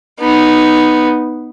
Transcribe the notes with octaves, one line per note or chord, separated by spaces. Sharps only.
B3 D#4